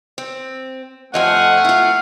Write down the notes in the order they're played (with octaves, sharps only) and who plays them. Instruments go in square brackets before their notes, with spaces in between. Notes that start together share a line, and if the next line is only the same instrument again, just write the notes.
[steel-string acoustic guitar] C4
[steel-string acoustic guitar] F2 F3 D#5 [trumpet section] A3 F#5 [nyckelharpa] F5 G#5
[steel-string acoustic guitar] E4 F4 [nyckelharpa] F5